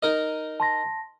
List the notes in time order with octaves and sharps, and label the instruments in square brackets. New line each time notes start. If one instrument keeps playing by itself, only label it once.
[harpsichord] D#4 A#4 D#5
[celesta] A5 C6 A#6